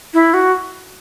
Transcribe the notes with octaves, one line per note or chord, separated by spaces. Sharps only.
E4
F#4